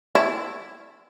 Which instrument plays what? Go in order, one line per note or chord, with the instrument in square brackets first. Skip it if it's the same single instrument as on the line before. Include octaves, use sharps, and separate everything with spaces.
[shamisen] E4